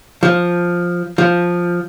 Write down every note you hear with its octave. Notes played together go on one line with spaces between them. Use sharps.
F3
F3